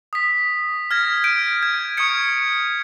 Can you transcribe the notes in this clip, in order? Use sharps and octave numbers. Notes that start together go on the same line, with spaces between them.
D#6 B6
F6 G#6 A#6
G6 D7 D#7
G#6
C#6 D#6 F6 G#6 C#7